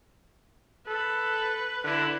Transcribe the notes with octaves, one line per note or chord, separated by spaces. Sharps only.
A4 B4
D3 E4 B4